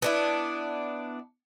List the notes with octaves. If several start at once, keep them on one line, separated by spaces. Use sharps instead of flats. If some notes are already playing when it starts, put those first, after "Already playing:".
B3 D4 E4